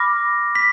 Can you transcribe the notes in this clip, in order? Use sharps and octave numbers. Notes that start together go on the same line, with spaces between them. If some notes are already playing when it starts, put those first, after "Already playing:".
Already playing: B5 D6 F6 A#6
B6